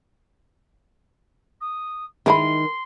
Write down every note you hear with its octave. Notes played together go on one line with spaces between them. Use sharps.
D#6
D#3 G#3 D#4 E4 A#4 B5 C6